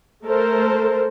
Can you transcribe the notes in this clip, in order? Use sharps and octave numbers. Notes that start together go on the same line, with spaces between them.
A3 A4 A#4 C5